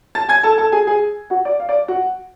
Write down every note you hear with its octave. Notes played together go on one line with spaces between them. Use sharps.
A5 A6
G#5 G#6
A4 A5
A4 A5
G#4 G#5
G#4 G#5
F#4 F#5
D5
F5
D5
F#4 F#5